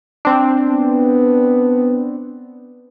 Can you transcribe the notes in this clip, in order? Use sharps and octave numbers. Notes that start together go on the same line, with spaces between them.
C4 D4
B3